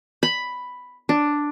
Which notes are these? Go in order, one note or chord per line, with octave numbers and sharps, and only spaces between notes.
B5
D4